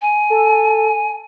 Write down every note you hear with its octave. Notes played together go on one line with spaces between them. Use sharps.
G#5
A4